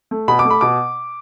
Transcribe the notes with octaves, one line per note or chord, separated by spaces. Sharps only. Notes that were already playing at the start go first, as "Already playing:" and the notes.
A3
B2 B5
D6
A3
B5
B2 D6